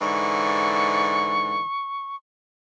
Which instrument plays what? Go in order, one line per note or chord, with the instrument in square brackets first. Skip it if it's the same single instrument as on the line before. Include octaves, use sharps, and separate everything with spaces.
[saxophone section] G#2 D3 E3 [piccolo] C#6